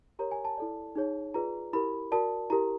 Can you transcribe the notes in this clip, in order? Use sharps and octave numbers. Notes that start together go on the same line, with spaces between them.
G4 A#4 C#5 A#5
G#5
A5
E4 A4 D5
D#4 G#4 C#5
F4 G#4 B4 D5 A#5
E4 G4 A#4 B5
F#4 A#4 D5 A5
E4 G4 A#4 A#5